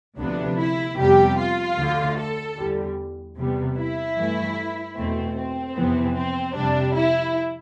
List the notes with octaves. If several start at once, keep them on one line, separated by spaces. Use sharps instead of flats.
D2 C3 F3 B3 D4
E4
F2 C3 G3 B3 G4
F4
D2 D3 A3
A4
E2 D3 G3
E2 C3 G3 B3
E4
G2 E3 A3
E2 B2 A3 C4
C4
F2 C3 E3 B3
C4
F2 C3 G3 D4
E4